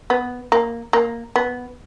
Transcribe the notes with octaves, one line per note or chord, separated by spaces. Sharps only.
B3
A#3
A#3
B3